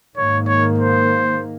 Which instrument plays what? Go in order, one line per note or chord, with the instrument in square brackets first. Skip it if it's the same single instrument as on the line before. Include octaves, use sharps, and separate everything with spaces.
[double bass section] G#2 D#3 A#3 [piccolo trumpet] C#5
[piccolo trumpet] C#5
C5